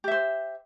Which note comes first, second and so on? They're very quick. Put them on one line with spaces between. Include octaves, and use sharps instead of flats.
G4 E5 C5